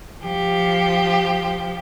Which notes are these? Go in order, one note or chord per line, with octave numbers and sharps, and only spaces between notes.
F3 G4